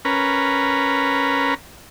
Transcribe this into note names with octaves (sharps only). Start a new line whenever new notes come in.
C#4 A#4 B4